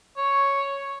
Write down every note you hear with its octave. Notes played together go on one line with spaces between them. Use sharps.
C#5